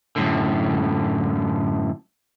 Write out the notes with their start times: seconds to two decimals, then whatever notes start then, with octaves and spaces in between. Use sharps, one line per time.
0.16 F#2 A2 D3